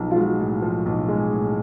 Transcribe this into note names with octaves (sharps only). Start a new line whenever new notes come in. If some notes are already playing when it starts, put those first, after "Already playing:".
Already playing: B1 F3
F4
G#3 F#4
A2
F3
B1
G#3 G#4
A2